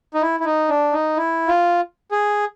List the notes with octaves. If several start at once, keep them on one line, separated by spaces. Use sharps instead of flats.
D#4
E4
E4
D#4
D4
D#4
E4
F4
G#4